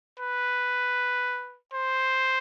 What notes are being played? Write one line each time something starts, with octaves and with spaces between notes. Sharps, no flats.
B4
C5